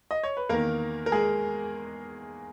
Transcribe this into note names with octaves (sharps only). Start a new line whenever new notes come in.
D#5
C#5
B4
E2 D#3 A#3 A#4
A#4
G#3 G#4